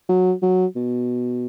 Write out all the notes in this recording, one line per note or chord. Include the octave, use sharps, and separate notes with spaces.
F#3
F#3
B2